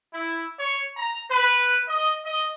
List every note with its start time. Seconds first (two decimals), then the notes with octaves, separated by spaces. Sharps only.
0.13 E4
0.58 C#5
0.96 A#5
1.30 B4
1.88 D#5
2.25 D#5